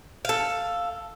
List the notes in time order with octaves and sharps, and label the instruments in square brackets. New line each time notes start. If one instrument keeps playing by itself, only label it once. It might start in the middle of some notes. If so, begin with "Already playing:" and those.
[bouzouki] A4 F5